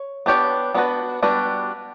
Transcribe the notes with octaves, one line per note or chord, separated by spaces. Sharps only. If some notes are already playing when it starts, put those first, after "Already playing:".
Already playing: C#5
B3 D4 G4 C#5
G3 B3 D4 F#4 B4
G3 B3 D4 F#4 B4